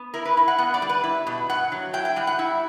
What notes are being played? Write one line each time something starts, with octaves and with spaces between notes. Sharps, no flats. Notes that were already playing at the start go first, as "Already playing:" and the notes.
Already playing: B3
E4 A#4
B4
E4
F#5
B3 F#5
D5
G3
B4
E4
B2
G2 F#5
F#3
E4 G5
G5
G3 F#5
F#5
E4